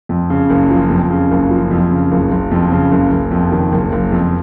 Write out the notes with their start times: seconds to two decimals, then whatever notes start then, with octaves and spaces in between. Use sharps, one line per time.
0.09 F2
0.30 C#3
0.50 F#1
0.70 F3
0.90 F2
1.10 C#3
1.31 F#1
1.50 F3
1.71 F2
1.91 C#3
2.11 F#1
2.31 F#1
2.51 F2
2.72 C#3
2.92 F#1
3.12 F#1
3.31 F2
3.52 D#3
3.72 F#1
3.92 F#1
4.12 F2